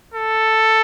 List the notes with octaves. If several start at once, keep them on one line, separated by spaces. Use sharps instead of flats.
A4